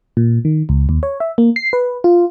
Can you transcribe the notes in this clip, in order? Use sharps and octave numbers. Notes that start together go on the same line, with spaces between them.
A#2
D#3
C#2
D#2
C#5
E5
A#3
C7
B4
F4